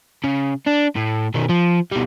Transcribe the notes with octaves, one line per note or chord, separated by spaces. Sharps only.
C#3
D4
A2
B2 D#3
F3
B2 G3